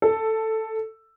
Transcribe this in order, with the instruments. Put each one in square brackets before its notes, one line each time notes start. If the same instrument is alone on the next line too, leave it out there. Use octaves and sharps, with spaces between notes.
[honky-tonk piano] A4